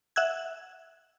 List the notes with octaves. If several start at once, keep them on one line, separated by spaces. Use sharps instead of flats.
E5 F#5 E6 F#6 G#6